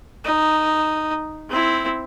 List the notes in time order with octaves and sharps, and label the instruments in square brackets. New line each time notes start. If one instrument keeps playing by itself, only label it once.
[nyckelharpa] D#4
C4 E4